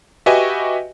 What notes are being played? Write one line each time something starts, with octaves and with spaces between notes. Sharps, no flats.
F#4 G4 B4 D#5 E5 G#5